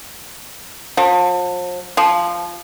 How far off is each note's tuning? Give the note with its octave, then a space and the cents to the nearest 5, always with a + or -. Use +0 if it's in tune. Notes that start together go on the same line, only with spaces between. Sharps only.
F3 +40
F3 -10